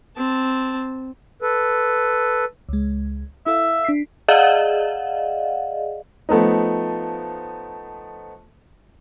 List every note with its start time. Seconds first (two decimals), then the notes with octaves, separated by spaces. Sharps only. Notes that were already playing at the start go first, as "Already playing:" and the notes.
0.17 C4 A5
1.42 A4 B4
2.69 C#2 G#3
3.46 E4 A4 E5 F5
3.85 D4 B6 C7
4.28 G#4 D5 D#5 F5 F#5
6.29 F3 A3 B3 D#4